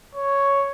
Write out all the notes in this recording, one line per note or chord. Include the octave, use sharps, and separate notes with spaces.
C#5